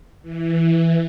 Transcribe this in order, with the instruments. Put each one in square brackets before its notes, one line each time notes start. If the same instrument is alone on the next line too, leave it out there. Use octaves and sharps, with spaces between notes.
[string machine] E3